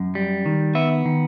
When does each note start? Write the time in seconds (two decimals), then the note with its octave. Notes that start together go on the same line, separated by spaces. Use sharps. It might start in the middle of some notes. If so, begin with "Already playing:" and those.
Already playing: F#2
0.15 G3
0.46 D#3
0.75 B3 E5
1.05 D#3